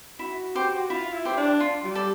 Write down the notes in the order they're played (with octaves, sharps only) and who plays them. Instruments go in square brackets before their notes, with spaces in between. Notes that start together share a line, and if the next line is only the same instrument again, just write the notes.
[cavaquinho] E4 [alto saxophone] F#4
[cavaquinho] G4 C5
[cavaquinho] E4 [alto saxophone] F4
[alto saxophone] E4
[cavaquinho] G4 C5
[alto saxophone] D4
[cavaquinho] F4
[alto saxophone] G3
[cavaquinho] A4 D5